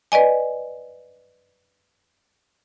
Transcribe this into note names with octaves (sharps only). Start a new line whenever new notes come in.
B4 D5 D#5 G#5